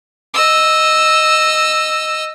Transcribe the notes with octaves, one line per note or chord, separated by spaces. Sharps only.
D#5 E6